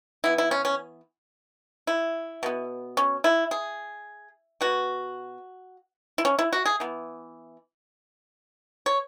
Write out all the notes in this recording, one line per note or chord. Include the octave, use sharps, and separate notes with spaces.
E3 B3 E4
E4
C#4
C#4
E4
B2 B3
C#4
E4
G#4
B2 B3 F#4
E4
C#4
E4
F#4
G#4
E3 B3
C#5